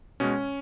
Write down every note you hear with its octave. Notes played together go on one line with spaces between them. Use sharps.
B2 G#3 C#4